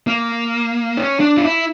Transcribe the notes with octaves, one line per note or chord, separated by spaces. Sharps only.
A#3
C#4
D4
F4
E4